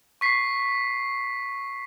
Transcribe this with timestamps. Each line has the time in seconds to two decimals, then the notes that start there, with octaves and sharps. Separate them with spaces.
0.21 C#6 B6 C7